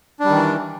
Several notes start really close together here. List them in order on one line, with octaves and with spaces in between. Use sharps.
D4 G3 D#3 E3